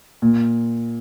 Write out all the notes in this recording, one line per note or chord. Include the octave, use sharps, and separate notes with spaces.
A#2